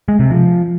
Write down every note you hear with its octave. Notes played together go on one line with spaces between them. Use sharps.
G#3
C3
F3